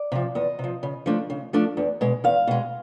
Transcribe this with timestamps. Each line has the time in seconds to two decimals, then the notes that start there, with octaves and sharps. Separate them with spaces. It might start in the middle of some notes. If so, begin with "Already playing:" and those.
Already playing: D5
0.12 C3 F3
0.35 E2 D#5
0.59 C3 F3
0.83 C#3
1.06 F3 A3 D4
1.30 C#3
1.53 F3 A3 D4
1.77 E2
2.01 B2 G#3
2.24 E2 F5
2.47 B2 G#3